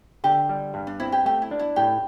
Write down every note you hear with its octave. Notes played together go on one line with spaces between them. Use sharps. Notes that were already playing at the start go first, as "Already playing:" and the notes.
D3 G4
G3
G2
D4
C4 E4
G4
A3 G4
E4
D4
E4
A2 G4